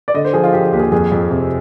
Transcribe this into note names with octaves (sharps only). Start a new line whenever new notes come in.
D5
D3 D#5
C5
F3 G#4
F4
F3 G4
G#4
D#2 G4
G#4
F2 G#4
F2
C3